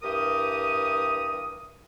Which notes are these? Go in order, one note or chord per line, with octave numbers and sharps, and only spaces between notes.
G2 E3 G4 A#4 D#6